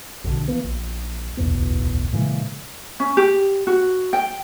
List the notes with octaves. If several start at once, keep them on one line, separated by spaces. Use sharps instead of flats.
A#1 B2 D3
E3 A#3 B3
A#1
D1 B1 E2 B3
A#2 C#3 E3 G#3
C#4
G4
F#4
G5